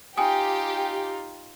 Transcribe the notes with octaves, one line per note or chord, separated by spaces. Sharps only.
D#4 F4 G4 G5 G#5 D#6